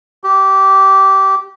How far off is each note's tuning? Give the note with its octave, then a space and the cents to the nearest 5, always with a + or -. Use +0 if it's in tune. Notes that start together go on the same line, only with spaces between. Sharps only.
G4 -20